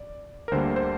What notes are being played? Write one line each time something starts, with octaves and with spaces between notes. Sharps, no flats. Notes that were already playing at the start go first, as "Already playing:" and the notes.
Already playing: D5
A#4
D2 D3 G3 A#3 C5
C5